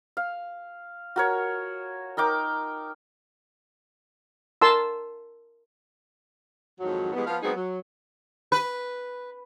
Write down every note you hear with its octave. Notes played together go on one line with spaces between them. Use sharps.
F5
F#4 A#4 C#5
D#4 A#4 G5 D6
A#4 A5 C6 E6
F2 G#2 D#3 F#3
E3 G3 G#3 B3
F3 B3 F5
F#3 G#3 B3 C4 D#4 G#4
F#3
B4